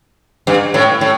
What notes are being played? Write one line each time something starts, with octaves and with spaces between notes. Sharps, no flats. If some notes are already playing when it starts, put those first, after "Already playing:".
G2
A2
A2